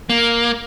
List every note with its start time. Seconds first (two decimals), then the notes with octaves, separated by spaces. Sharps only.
0.10 A#3